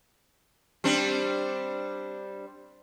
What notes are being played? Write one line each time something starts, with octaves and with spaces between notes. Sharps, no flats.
G3 C4 D4